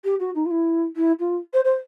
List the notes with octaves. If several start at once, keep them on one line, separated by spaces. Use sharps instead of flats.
G4
F#4
D#4
F4
E4
E4
F4
C5
C5